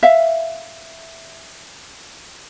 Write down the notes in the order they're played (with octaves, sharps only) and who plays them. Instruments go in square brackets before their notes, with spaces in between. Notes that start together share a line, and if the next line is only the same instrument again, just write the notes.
[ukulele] E5 F5